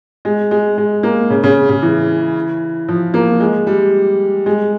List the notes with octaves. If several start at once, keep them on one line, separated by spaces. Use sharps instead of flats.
G#3
G#3
G#3
A#3
C#3
C#3
C#3
E3
F3
A#3
G#3
G3
G#3